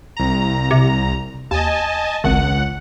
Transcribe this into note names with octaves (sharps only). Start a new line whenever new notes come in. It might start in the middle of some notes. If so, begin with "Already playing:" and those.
C2 A#5
C3
D#2 D#5 G#5 A5
G#1 C#2 F#5